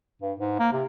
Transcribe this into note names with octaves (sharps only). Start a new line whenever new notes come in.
G2
G#2
A#3
C3